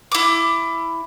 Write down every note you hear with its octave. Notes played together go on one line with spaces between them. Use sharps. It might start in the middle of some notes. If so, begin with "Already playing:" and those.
E4 D6